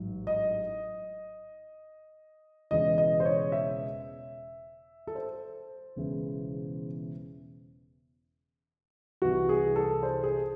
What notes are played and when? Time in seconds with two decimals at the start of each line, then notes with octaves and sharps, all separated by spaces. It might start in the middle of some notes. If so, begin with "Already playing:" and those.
Already playing: A1 G#2 F#3
0.27 D#5
2.71 E1 E2 C#3 E3 D#5
2.98 D#5
3.20 C5
3.25 C#5
3.52 E5
5.07 A4
5.15 C5
5.96 E1 E2 C#3 E3
9.22 C2 C3 E3 F#4
9.49 G#4
9.76 A4
10.03 C5
10.23 G#4